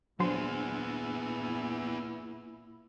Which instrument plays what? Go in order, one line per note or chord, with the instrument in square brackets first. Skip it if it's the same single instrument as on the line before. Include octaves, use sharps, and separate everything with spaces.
[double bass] A#2 E4 [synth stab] F#3 C5 [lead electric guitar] B3 G#4 [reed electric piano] D4